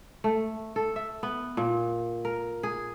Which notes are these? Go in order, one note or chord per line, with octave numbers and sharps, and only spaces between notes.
A3
A4
E5
B3
A#2
A#4
G#4